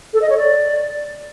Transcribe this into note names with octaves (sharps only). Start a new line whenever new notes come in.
A4
D#5
C#5
D5